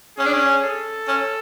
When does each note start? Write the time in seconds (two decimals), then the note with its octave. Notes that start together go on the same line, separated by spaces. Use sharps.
0.18 C#4 G#4
0.26 D4
0.33 C#4
0.64 A4
1.08 C#4